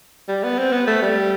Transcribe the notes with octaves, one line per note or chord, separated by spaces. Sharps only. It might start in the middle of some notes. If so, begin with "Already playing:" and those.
G3
B3
C4
B3
A3
G3